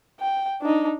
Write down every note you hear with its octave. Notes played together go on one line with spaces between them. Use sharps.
G5
D4 D#4